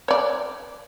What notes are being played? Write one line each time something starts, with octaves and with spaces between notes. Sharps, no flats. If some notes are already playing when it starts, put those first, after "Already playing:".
C#5 D5